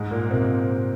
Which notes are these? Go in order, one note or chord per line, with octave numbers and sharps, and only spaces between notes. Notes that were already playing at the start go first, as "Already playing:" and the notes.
Already playing: G#2 G#3
A#2 A#3
C3 C4